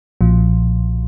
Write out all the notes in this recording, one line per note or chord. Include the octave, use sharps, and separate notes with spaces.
B1 A#2 F3